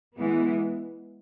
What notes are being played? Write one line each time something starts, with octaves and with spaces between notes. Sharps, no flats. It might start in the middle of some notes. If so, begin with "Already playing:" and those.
E3 G#3 B3